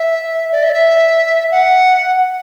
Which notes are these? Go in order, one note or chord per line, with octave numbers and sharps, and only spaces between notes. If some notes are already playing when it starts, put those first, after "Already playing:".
Already playing: E5
D5
E5
D5
E5
F#5